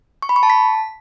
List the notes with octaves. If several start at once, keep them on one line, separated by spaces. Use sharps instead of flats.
C#6
B5
C#6
A5
B6